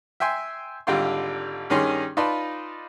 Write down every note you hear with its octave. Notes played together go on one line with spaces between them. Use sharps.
E5 G5 G#5 C6
G#1 D3 G3 F4 G5 C6
G2 D#3 C#4 D#4 G#4 C6
D#4 F4 B4 D5 A5 C6